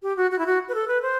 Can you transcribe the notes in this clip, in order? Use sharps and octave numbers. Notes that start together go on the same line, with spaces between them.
G4
F#4
F#4
E4
F#4
B4
A4
B4
C5